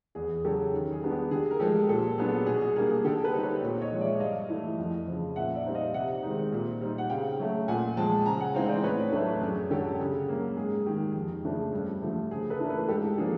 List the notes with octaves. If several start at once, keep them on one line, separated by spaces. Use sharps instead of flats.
E2 G#4
C#3 F#3 G4 A4
D#3
G#4
G3 B3 D4
G4
D3 G#4
A#4
F3 G#3 G4 A4
A#2 G4 A4
F#3 B3 D4 G#4
B2 G#4
G#4
G3 A#3 D4 G#4 A#4
G#4
D3 G4 A4
A4 B4
G3 C4 D#4
B4 C#5
A#2
C#5 D#5
F3 G#3
D5 E5
G2 D#5 F5
E3 A3
F2
C#3 F3
A#2 E5 F#5
D5 E5
G3 C4 D#4
D#5 F5
C3 E5 F#5
D#3 G#3 C4 D#4
A#2
G3 C4 D#4
F#5
C#3 F5 G5
F#3 A3
A#2 F#5 G#5
F3 G#3 G5 A5
C#3 G#5 A#5
F#5 G#5
E3 G#3 C4 D#4 F5 G5
C5 D5
A2 B4 C#5
F#3 A3 D4 A4 B4
F#2 G#4
D3 F#3 G4 A4
C#3 G#4
F#3 A#3
G#2 G#4
D#3 G#3 G4
F2
C#3 F3 A3 D4
G2
D3 F3 A3
C#3 G#4
A4 B4
E3 A3 D4 A#4
A4 B4
G#2 G4 A4
F3 A#3 D4 G#4